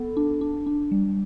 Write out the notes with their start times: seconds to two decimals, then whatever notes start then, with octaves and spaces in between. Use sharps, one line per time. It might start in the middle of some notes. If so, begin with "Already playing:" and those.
Already playing: B3 A4
0.17 D4
0.41 D4
0.66 D4
0.91 G3